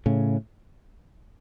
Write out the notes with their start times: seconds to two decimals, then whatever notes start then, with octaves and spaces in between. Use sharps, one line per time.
0.06 A2 C#3